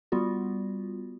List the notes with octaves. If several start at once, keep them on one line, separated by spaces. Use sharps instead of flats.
G3 B3 F4 F#4